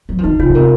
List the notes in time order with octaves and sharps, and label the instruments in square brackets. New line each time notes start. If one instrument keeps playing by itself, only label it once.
[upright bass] F#3
F3
[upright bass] D#3 [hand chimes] D#4
[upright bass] C#3 [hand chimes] F4
[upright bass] C#3
[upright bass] C3 [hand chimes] A#4